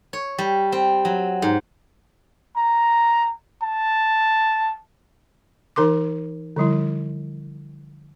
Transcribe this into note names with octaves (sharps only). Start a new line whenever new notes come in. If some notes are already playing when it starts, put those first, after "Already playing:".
C#5
G3
C4
F#3
G#2
A#5
A5
E3 D#4 A#4 C6 D6
D3 F3 G3 E4